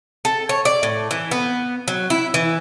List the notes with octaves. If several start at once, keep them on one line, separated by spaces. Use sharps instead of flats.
A4
C#5
D5
A2
E3
B3
F#3
E4
E3